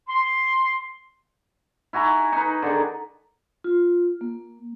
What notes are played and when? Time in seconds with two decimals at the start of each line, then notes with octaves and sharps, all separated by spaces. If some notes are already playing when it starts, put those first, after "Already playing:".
0.08 C6
1.93 E4 F#4 G#5 A#5
2.32 D#4 B4
2.62 D3 D#3 G#4
3.64 F4
4.21 A#3